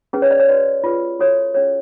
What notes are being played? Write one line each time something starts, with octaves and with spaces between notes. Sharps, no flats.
C#4 G#4 B4
C#5
D5
C#5
F#4 B4 D5
F4 G#4 B4
F#4 A4 C#5
C#4 G#4 C#5